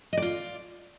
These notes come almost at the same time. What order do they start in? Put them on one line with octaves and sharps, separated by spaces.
D#5 D5 F4